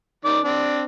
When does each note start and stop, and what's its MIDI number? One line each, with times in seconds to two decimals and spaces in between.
0.25 0.39 51
0.25 0.39 74
0.44 0.83 60
0.44 0.83 62